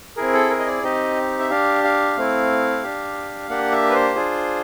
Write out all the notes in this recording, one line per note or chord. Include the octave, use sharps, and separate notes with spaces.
C4 E4 G#4 A#4
A4
A#4
D#5
D5
C4 D#4 G4 D#5
E5
D4 G4 F5
F5
A3 C4 E4
D4 G4
A#3 D4 G4 F#5
E5
B4
C5
D4 F4 G#4